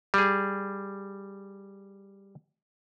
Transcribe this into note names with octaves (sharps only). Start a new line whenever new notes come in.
G3 G#4